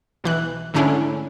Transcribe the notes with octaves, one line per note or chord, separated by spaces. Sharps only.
B1 E3 F#6
G#2 D3 A3 C#4 D4 E4